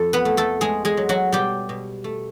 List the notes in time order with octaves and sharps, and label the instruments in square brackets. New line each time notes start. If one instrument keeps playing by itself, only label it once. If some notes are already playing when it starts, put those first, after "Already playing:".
Already playing: [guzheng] F2 A4
B3 B4
A3
A3 A4
G#3 A3 G#4
G#3 G#4
F#3
F#3 F#4
B2 G3 G4
B2
A3